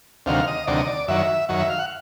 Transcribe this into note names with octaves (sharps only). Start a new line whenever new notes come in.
D2 C3 D#3 F#3 F5
D#5
D2 C3 D#3 F#3 D5
D#5
D5
F#2 D#3 F#3 E5
F#2 D#3 F#3
E5
F5
F#5